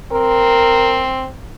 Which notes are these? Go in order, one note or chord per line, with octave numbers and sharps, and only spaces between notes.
C4 A#4